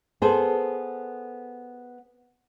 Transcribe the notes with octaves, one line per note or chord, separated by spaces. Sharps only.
B3 G#4 A4 C5